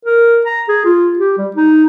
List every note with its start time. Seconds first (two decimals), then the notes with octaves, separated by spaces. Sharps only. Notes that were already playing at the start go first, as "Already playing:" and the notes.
0.05 A#4
0.46 A#5
0.68 G#4
0.85 F4
1.19 G4
1.38 G3
1.56 D#4